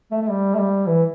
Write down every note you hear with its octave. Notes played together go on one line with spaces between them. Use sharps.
A3
A3
G3
A3
G3
E3